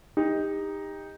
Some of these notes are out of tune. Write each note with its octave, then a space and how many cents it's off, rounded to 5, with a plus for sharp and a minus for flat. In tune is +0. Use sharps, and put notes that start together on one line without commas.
D#4 +0 G4 +30